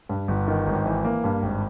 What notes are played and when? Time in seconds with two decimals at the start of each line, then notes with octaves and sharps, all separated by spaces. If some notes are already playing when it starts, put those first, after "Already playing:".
0.09 G2
0.28 G1
0.48 D#3
0.67 G#1
0.86 E3
1.05 A#3
1.24 G2
1.43 G#1